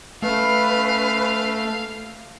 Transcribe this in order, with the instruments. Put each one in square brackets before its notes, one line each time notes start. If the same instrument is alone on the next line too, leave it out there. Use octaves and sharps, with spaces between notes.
[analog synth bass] A3 [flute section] C#4 B4 [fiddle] F5